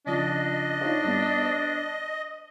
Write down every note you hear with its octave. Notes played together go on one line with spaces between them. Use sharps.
C#3 F3 D4 D#5
D#4 F4 C#5
G2 B3
C5